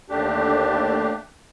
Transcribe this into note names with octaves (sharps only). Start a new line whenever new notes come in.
D#2 D3 A3 D4 G4